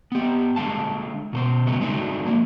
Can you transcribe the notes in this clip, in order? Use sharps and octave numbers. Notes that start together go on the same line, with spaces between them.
B3 G4
D3 G#3 F5 A5
B2 A4 C5
C#3 F#3 G#3 A3 B3
G#3 A3 D4 D#4 F#4
D3 F3 A#3